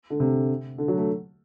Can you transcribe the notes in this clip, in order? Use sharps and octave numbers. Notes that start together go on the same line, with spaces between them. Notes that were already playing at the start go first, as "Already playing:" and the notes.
D3
C3
D3
F#3
A3